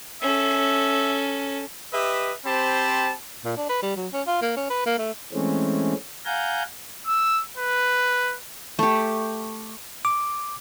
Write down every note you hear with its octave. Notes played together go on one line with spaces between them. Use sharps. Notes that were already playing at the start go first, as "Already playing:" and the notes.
C#4 A4 E5
G4 B4 D#5 E5
C4 G4 C5 A5 B5
A#2
D4
B4
G3
F#3
C#4
F4
A#3
C#4
B4
A#3
A3
E3 G#3 A3 C4 C#4
F5 F#5 G#5 A#5 G6
E6
B4
A3 G4
D6